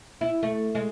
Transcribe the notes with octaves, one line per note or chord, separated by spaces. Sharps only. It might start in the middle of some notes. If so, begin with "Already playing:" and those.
E4
A3
G#3